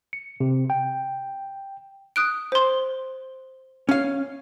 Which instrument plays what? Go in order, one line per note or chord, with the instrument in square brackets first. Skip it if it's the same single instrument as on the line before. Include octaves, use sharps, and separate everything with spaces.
[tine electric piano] C#7
C3
G5
[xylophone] D#6 F#6 D7
C5 C6
[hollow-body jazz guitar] C#4 F5